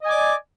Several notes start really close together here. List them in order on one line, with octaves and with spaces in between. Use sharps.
D#5 G#5 D6 D5